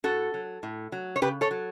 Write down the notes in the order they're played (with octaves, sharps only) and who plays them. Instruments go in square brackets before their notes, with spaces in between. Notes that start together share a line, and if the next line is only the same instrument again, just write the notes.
[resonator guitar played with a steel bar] A2 F#4 A4
F#3
A2
F#3
C#5
C#3 G4 B4
A4 C#5
F#3